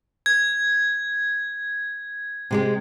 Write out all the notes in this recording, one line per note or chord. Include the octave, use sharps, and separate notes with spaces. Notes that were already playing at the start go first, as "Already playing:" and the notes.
G#6
C3 G#3 G4